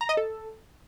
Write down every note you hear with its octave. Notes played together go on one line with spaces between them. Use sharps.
A#5
D#5
A4